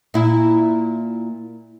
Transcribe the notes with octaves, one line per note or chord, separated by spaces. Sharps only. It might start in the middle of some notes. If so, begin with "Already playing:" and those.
A#2 E4